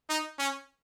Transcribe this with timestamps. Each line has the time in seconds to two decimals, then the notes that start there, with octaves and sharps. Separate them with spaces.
0.09 D#4
0.39 C#4